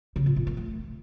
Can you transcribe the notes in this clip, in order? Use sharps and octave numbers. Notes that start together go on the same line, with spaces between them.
C#3
A#2
A#2
A#3
A3